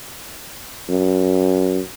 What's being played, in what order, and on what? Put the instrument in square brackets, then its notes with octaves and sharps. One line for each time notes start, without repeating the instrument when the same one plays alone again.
[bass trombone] F#2